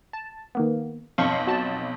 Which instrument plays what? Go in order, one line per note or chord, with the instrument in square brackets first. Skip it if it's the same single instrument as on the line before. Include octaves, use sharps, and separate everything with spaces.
[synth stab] A5
D#3 A#3 B3
[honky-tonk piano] B1 F2 [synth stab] F5 C6 C#6
[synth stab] F#4 A5